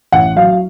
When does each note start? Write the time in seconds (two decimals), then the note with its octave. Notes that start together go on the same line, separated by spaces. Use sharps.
0.12 A1 F#5
0.36 F#3 F5